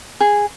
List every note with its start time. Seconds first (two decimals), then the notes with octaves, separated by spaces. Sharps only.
0.20 G#4